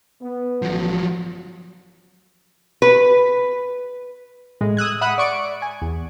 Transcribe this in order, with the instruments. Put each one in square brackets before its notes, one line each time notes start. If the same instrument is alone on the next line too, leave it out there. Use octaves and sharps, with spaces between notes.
[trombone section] B3
[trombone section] A1 G2 [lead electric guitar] F3 F#3
[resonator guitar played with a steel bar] B4
[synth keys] A2 G#3
D#6 E6 F#6 G#6
E5 F#5 B5 D#6 F#6
D5 C#6 D7
G#5
E2